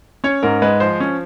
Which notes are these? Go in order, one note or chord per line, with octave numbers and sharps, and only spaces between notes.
C#4 C#5
G#2 A#4
G#3 B4
F3 C5
C#4